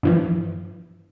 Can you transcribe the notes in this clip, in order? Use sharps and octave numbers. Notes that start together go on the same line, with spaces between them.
G2 E3 F3